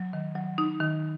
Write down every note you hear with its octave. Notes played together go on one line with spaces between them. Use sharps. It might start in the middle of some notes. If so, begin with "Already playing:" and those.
Already playing: F#3
D#3
F#3
D#4
D#3